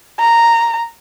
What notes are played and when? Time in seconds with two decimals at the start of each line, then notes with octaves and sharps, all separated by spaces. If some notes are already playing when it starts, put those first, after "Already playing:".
0.19 A#5